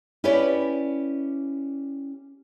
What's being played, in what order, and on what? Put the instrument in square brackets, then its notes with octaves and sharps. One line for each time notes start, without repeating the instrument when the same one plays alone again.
[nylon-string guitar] C#4 E4 G4 B4 C#5 D5